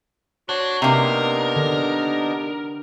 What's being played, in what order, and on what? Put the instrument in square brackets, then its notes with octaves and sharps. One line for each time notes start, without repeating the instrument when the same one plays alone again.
[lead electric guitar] D4 [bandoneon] F#4 C#5 F#6 [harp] C5
[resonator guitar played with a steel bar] C3 A#3 [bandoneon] B3 D4 D#4 [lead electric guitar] A#4
[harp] D3